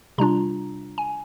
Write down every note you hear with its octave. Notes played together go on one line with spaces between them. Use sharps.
C3 G3 D4 F4 A#5
G#5